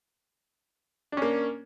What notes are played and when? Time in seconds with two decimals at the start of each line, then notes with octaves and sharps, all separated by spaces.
1.12 D4
1.17 C#4
1.22 A#3